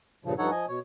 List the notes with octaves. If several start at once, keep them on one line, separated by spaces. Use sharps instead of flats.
G2 A#2 C#3 F3
G2 F3 D#4 A4 C#5 F#5
F3 D#5 G#5
B2 C#5